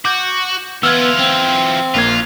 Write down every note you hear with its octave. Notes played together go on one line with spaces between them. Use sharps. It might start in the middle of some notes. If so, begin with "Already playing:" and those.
F#4 D6 G6
E3 B3 F4 E6 F6 G#6
C4
A#1 A#3 F4 G#6